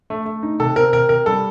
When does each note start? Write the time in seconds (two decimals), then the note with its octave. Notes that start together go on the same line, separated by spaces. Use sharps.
0.10 A3
0.26 A3
0.43 D#4
0.60 C3 A4
0.76 C4 A#4
0.93 C3 A#4
1.09 C3 A#4
1.26 G3 A4